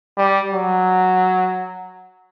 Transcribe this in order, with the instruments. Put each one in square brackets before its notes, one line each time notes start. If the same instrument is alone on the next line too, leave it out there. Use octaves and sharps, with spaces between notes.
[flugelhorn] G3
F#3